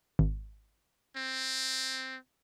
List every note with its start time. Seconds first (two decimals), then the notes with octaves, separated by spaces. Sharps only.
0.19 G#1
1.17 C4